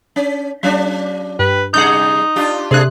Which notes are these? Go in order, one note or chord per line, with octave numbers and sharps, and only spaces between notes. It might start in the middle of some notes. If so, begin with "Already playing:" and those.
C#4
F#3 C#4 D4
G2 B4
C3 G3 D#4 G#4 F#5 G6
D4 F4 G4
C3 A3 C4 D4 G#4 F#6